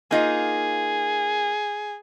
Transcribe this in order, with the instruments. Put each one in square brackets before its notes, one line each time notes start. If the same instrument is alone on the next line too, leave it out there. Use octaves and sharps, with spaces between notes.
[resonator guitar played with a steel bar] A#3 D#4 F4 [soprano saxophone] G#4